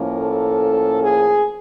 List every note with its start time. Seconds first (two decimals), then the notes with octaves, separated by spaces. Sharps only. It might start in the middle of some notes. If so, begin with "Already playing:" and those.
Already playing: A2 F3 A#3 C#4
0.20 A4
1.02 G#4